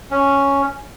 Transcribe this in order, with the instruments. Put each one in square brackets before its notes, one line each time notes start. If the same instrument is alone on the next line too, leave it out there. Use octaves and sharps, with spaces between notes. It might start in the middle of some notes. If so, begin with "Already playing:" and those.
[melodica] C#4